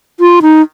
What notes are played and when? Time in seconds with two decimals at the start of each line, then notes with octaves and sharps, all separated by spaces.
0.20 F4
0.42 D#4